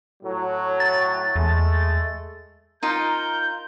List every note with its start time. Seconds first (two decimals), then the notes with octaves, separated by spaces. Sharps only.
0.22 A2 F#3
0.80 A6
1.36 E2 G#3 A3
2.83 D#4 F4 A#4 G6